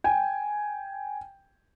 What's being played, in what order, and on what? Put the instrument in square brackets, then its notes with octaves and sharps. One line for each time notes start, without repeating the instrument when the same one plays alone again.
[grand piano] G5 G#5